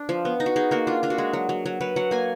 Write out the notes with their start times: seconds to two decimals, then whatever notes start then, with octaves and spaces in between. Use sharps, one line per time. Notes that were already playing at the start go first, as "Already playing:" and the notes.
Already playing: D4
0.09 F3
0.25 B3
0.40 D#4
0.46 F#4
0.56 D#4 G#4
0.71 A#3 F#4
0.87 D4 F4
1.03 D4 F4
1.10 F#4
1.18 G#3
1.33 F#3
1.49 F#3
1.66 F#3
1.81 F#3 B4
1.96 F#3 F#5
2.11 A#3 G#5